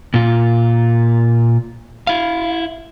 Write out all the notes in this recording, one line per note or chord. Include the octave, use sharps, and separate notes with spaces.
A#2 F4
E4 F5